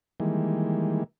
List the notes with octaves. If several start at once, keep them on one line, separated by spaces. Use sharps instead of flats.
D#3 E3 G3 G#3 A#3